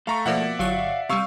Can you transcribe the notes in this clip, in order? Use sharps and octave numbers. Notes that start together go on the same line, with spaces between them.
A3 A4 F5 A#5 C#6
B2 F3 A#3 D5 E5 F#5
G1 F#3 F5 C#6
C3 G3 F5 C#6 E6